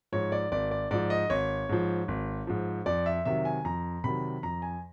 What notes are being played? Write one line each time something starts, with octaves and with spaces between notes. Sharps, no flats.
G#2 F3 C#5
D5
G#1 D5
D5
G#2 F3 D5
D#5
G#1 C#5
G#2 F3
G#1
G#2 F3
F2 D5
E5
C3 D#3 F#3 E5
G#5
F2 A#5
C3 D#3 F#3 B5
F2 A#5
G#5